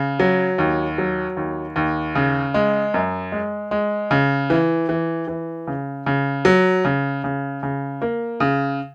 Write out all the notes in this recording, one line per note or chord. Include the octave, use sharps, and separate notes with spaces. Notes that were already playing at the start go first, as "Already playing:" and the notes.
Already playing: C#3
F#3
D#2
F#3
D#2
D#2
C#3
G#3
F#2
G#3
G#3
C#3
E3
E3
E3
C#3
C#3
F#3
C#3
C#3
C#3
A#3
C#3